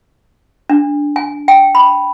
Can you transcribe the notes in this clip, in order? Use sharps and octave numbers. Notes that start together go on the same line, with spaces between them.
D4
G#5
G5
B5